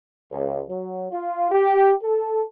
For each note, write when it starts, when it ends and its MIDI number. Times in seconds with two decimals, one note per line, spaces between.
0.30 0.61 37
0.68 1.06 54
1.12 1.49 65
1.52 1.93 67
2.03 2.42 69